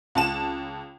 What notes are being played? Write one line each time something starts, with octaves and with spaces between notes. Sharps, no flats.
C#2 A5 E7